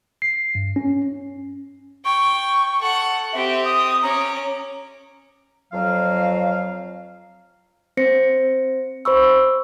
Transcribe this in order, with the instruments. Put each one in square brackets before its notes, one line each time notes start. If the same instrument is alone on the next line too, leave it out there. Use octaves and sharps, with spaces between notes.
[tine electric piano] C7
G2
C#4
[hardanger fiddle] G5 [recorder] C#6
[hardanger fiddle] A4 F#5
[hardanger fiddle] C4 G4 [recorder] E5
[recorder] D#6
[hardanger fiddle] C#4 D6 [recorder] A#5
[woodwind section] F2 F#3 F5
[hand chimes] C4 C5 A#6 C#7
C5 B5 C#6 E6